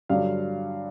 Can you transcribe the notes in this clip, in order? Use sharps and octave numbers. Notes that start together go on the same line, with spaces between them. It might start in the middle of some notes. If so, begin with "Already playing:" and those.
G2 D3 F#3 F5